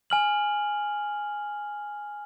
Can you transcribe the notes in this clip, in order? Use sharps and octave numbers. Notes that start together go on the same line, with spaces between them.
G#5 F6 F#7